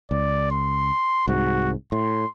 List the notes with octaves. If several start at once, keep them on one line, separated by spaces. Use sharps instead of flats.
C#2 D5
C6
C2 G#2 F#4
A2 C6